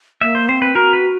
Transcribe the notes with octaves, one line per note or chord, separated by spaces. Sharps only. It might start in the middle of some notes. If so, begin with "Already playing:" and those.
A#3 E5
C5
C4 C5
B4
F#4 A#4
B4